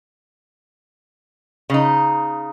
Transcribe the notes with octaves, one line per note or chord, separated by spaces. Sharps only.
C#3 D#4